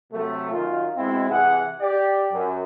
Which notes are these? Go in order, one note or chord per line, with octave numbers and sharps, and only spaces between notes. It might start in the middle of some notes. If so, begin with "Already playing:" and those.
C3 F#3 A3
F#2 D#3 F4
B2 G#3 C4 E4
C3 E3 G#4 F#5
G4 D5
F#2